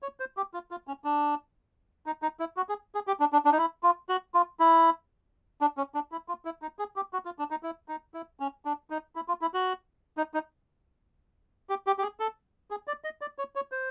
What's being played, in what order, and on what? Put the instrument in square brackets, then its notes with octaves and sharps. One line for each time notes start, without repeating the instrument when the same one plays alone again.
[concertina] C#5
C5
G4
F4
F4
C#4
D4
D#4
D#4
E4
F#4
G#4
G#4
G4
D4
D4
D4
D#4
E4
F4
F#4
F4
E4
D4
C#4
D4
E4
F4
E4
D#4
G#4
G4
F#4
F4
D4
D#4
E4
D#4
E4
C#4
D4
D#4
E4
F4
E4
F#4
D#4
D#4
G4
G4
G4
G#4
A4
G#4
D5
D#5
D5
C#5
C#5
C5